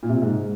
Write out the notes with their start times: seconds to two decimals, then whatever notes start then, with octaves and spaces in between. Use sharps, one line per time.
0.03 A#2
0.09 C3
0.15 A#2
0.22 G#2